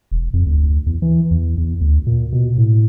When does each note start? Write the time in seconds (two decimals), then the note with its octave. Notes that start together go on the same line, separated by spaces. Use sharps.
0.11 E1
0.34 F2
0.46 D2
0.86 E2
1.02 E3
1.31 E2
1.58 E2
1.81 D2
2.07 A#2
2.32 B2
2.57 A2